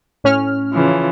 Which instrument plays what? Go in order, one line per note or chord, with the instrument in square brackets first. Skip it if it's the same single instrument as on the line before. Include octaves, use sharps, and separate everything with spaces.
[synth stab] A2 C#4 F6
[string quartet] C#3 E3 F3